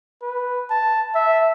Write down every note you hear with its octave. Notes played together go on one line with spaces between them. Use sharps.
B4
A5
E5